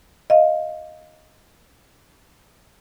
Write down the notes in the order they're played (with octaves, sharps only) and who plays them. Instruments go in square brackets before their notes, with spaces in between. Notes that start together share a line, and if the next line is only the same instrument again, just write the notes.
[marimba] D#5 F5